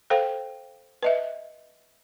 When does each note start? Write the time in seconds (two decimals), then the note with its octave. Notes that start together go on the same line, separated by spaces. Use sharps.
0.10 A4 C5 F5 G5
1.03 B4 D#5 E5